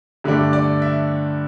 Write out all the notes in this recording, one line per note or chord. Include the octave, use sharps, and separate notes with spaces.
G2 D3 A3 D4
D5
E5